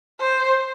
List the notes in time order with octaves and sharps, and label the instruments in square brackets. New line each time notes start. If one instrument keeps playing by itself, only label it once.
[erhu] C5